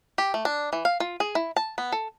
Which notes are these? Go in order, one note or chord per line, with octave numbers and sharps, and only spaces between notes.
G4
A3
D4
E3
F5
F4
G#4
E4
A5
B3
A4